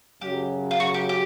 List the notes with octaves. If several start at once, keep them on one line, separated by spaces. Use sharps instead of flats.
F#2 C#3 F#3 G4
F4
F#4
G4
G4